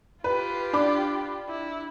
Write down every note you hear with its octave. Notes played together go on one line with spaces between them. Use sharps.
F4 G4 B4
D4 B5 D6
E4